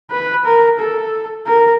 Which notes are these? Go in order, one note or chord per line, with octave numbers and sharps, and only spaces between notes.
B4
A#4
A4
A#4